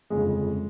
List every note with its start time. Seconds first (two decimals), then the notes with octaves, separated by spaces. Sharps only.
0.10 G1 F2 C#3 G#3